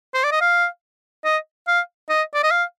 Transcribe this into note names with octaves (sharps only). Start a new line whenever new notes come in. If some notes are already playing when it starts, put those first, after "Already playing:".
C5
D5
D#5
F5
D#5
F5
D#5
D5
D#5
F5